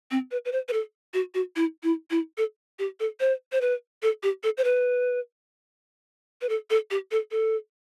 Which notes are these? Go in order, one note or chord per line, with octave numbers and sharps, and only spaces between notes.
C4
B4
B4
C5
B4
A4
F#4
F#4
E4
E4
E4
A4
G4
A4
C5
C5
B4
A4
G4
A4
C5
B4
B4
A4
A4
G4
A4
A4